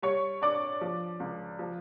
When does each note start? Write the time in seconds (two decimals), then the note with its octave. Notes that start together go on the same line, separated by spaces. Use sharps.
0.02 G3 C#5 C#6
0.42 D4 D5 D6
0.81 F3
1.20 C#2
1.59 F3